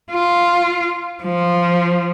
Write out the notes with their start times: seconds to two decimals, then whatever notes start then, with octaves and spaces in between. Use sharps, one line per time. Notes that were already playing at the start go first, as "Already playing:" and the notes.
0.11 F4
1.23 F3